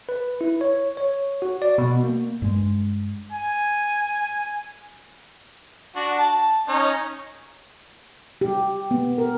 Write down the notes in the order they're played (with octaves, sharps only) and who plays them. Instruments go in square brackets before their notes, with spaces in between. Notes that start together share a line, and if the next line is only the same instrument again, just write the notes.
[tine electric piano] B4
E4
C#5
C#5
F#4
D5
B2
A#3
[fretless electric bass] G2 G#3
[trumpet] G#5
[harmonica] D4 F#4
A5
C#4 D#4
[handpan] G4
B3
A#4